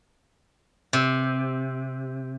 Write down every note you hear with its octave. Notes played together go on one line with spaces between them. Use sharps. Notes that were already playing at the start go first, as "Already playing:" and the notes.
C3